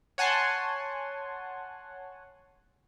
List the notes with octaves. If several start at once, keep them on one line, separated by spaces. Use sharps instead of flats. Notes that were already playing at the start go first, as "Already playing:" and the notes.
C#5 F#5 G#5 A5 C6